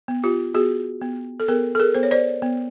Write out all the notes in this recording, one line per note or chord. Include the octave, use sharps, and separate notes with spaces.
B3
F4 G4
B3 F#4 G#4
B3
A4
B3 G#4 A#4
A4
G#4 A#4
B3 C5
C#5
C5 D5
B3